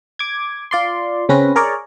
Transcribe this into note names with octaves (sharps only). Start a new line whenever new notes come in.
D6 G#6
F4 D5 C6
C#3 C4 C#4 B4 A#6
G#4 A#4 C#5 D5